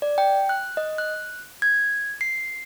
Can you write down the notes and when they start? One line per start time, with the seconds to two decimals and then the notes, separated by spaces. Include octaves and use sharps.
0.02 D5
0.18 G5
0.49 F#6
0.77 D#5
0.98 F#6
1.62 G#6
2.21 C7